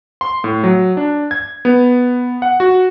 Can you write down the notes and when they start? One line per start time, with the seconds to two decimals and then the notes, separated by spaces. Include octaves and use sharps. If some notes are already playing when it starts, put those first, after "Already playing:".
0.21 C6
0.44 A2
0.64 F#3
0.97 D4
1.31 G#6
1.65 B3
2.42 F#5
2.60 F#4